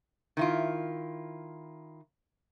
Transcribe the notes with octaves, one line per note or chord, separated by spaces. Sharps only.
D#3 E4 F4